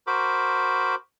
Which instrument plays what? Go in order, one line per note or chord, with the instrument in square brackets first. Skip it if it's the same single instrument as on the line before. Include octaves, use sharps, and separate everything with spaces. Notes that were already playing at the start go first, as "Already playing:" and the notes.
[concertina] F#4 A#4 C5 B5 D6